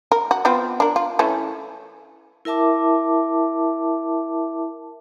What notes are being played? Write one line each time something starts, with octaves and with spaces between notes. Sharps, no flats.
A#4
F#4
B3 C4 F4
D4 A#4
F4
E3 A3 C#4
E4 A#4 E5 A5 D6